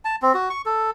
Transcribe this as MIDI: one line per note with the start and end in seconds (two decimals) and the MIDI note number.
0.05 0.16 81
0.22 0.33 60
0.34 0.49 66
0.50 0.62 85
0.66 0.91 69